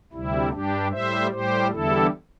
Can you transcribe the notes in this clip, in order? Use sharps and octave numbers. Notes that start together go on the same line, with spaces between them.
D2 C3 G3 E4
G2 G3 D4 G4
A2 G3 C5 E5
A2 G3 G4 C5
E2 D3 G3 E4 A4